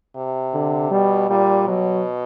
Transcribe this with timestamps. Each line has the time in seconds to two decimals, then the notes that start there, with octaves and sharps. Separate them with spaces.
0.16 C3
0.54 D3
0.91 B2 G3
1.29 A#2 G3
1.67 B2 F#3